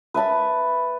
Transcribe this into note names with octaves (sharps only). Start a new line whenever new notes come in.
B4 E5 A5 B5